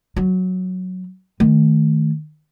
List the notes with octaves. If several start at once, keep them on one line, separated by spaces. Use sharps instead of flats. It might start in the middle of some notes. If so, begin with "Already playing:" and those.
F#3
D#3 A3